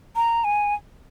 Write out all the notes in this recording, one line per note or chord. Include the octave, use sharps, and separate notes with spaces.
A#5
G#5